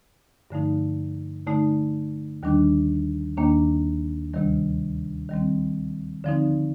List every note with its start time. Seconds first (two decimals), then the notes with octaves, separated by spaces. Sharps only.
0.50 G2 D3 F3 A3 D#4
1.47 D3 A3 D#4
2.43 D#2 D#3 G3 D4
3.37 D#2 D#3 A#3 D4
4.34 D2 C3 D#3 G3
5.29 D#3 G3 C4
6.24 D3 F3 C4 D#4